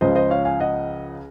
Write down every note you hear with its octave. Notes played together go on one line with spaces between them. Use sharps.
C#2 C#3 F3 C5 D#5
C5 D#5
C#5 F5
F5 G#5
D#5 F#5